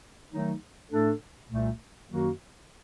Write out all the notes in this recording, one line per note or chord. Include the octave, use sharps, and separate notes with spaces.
D#3 F#3 A3 D#4
A2 A3 D4 A4
C2 A#2 A3
F#2 D#3 F#3 A#3 F#4